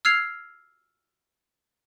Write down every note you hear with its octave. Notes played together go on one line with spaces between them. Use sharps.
E6 F6 G#6 C7 F7